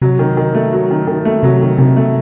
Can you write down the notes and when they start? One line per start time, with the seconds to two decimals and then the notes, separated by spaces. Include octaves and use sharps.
0.02 C3 F#3
0.19 D#3
0.37 D#3
0.55 A3
0.73 F#3
0.91 D#3
1.07 D#3
1.25 A3
1.43 C3 F#3
1.62 D#3
1.78 C3 D#3
1.96 A3